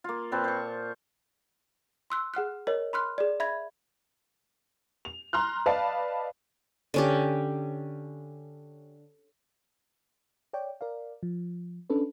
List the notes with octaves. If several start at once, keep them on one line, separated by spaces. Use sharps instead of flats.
A#3 F4
A#2 C4 B4 A5
C5 C#6
C6 E6 F#6
G#4 F#5 F6 F#6
A#4 C#5 D#5
B5 C6 F6 F#6
G#4 D5
E5 B5 G#6
F7
A#5 C6 F6 F#6
B4 D5 D#5 F5 A5
D3 C#4 G4
C#5 D5 G5
A#4 D5 F5
F3
C#4 D4 A4 B4